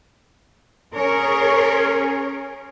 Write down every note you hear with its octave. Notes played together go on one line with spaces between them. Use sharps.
C#4 G#4 A#4 C#5